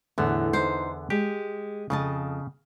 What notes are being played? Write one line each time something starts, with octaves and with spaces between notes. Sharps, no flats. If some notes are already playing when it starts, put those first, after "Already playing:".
E2 A2 D3 B3
D#4 C5
G#3 G4
F2 C#3 D#5 A5